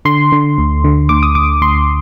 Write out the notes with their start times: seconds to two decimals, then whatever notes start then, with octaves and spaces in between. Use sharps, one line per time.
0.05 D3 C6
0.32 D3
0.58 D2
0.84 D3
1.09 D2 D6
1.23 D#6
1.35 D2 D6
1.62 D2 C6